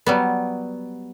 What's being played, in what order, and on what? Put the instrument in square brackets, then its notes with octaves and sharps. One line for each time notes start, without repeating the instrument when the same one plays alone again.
[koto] F#3 G3 B3